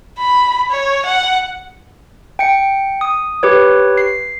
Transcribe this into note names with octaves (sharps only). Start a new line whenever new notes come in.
B5
C#5
F#5
G5 C#7
D#6
G4 B4 C#5
C7